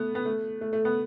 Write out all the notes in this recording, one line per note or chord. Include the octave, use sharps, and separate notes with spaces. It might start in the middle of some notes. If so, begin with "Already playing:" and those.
Already playing: A3 B3
B3
A3
A3
A3
B3